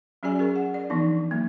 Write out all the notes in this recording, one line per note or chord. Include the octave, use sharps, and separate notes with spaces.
F#3 C#4 F#4 G#4 D5 G#5
G#4 A#4 C#6
F#5
D5
E3 F3 B3 D4 D#4
F#3 A#3